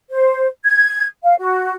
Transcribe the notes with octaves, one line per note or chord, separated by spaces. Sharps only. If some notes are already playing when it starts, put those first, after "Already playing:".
C5
G#6
F5
F#4